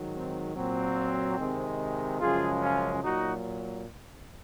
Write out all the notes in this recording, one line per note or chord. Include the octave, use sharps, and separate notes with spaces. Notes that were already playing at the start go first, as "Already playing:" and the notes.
Already playing: G#2 D#3 F#3
C4
A#2 F#3 C4
C3 D#3 G#3
F#2 C#3 F3 G#3 F4 G#4
C#4 F4
A#2 F#3 D#4 F#4